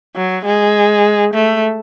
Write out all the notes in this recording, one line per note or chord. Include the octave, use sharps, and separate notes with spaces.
F#3
G#3
A3